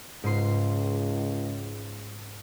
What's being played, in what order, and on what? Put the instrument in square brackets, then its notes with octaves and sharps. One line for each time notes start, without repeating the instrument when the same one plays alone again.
[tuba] C#2 [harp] G#2 C6